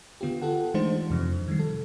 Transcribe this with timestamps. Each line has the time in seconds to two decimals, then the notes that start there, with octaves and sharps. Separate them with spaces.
0.21 D3 B3 F4 G4
0.42 F4 G4 A4 F#5
0.74 E3 G#3 A3 D4 D#4 C5
1.10 F2 C3 F3
1.48 D#3 G3
1.59 A4